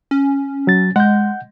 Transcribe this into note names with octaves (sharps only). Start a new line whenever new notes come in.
C#4
F#3 A6
G#3 F#5 G6